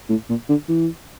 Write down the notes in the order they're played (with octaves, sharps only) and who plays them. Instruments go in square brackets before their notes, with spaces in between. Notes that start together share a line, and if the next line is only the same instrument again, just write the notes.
[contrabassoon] A2
A#2
D3
E3